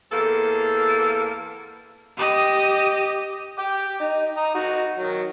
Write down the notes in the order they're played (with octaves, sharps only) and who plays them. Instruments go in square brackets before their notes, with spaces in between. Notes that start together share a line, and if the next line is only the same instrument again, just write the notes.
[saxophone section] E2 A#3 A4
[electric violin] G4 D#5
[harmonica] G5 D6
D#4
D#5 A#5
D#4 F#4
D#3 F#3